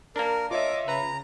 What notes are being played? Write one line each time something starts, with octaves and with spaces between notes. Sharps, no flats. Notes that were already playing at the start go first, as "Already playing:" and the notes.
A#3 D4 A#4
F4 C#5 D#5 E5 D6
C#3 B4 A#5